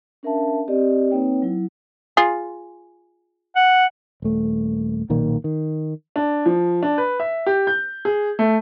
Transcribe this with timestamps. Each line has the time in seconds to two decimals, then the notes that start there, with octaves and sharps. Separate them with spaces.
0.23 C#4 D4 A#4 E5 F5 A5
0.68 C4 G4 D5 D#5
1.11 A#3 C4 D#4 B4 C#5 G5
1.42 F#3 E4
2.17 F4 G#4
3.56 F#5
4.22 D#1 A3
5.09 B1 A#2 D#3 A#3
5.44 D#3
6.16 D4
6.46 F3
6.83 D4
6.98 B4
7.20 E5
7.46 G4
7.67 G6
8.05 G#4
8.39 A3